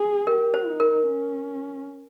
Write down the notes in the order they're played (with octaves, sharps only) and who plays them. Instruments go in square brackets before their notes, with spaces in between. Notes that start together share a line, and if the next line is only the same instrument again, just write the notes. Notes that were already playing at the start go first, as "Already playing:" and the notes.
Already playing: [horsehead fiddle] G#4
[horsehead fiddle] G4 [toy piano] A#4
[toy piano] C5
[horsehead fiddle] D#4
[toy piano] A#4
[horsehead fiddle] C#4